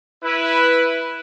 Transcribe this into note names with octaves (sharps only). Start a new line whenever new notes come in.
E4 B4